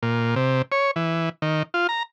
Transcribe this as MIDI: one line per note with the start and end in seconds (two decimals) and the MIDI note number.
0.02 0.35 46
0.36 0.62 48
0.72 0.91 73
0.96 1.29 52
1.42 1.63 51
1.74 1.87 65
1.89 2.03 82